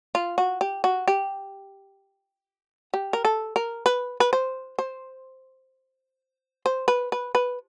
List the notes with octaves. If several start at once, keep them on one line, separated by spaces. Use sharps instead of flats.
F4
F#4
G4
F#4
G4
G4
A#4
A4
A#4
B4
B4
C5
C5
C5
B4
B4
B4